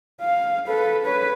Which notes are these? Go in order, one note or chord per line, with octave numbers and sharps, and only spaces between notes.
F5
A4 B4
B4 C#5